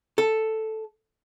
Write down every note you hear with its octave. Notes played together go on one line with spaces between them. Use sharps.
A4